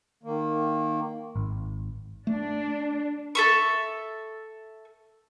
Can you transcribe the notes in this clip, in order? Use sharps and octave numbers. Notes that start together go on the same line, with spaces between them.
D#3 A#3
G#1
A3 D4
A4 E5 C#6